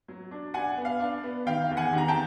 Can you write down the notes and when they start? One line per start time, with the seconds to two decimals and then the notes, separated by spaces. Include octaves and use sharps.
0.08 F#3
0.31 D4
0.54 D4 F#5 G#5
0.77 B3
0.85 F5
1.00 D4
1.23 B3
1.46 D#3 F5 G5
1.70 E2
1.77 F#5 G#5
1.93 D#3 A#5
2.08 G5 A5